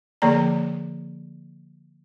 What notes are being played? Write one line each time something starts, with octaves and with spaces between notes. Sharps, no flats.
D3 F3 A#3 G#4 D5 A#5